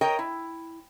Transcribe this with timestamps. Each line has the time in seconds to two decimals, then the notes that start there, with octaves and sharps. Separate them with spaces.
0.01 A#4 C#5 D#5 G5
0.19 E4